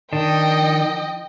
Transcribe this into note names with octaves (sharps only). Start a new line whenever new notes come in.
D#3 F3 D4 D#5 G5